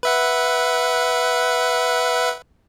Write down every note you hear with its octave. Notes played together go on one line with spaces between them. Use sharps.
B4 E5 F#5